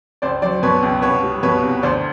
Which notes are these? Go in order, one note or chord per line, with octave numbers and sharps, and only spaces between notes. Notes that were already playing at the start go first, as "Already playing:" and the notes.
C#2 C5 D5
F#3 C5 D5
B2 B4 C#5
C#2
C2 B4 C#5
G3
B2 B4 C#5
C2
D2 C5 D5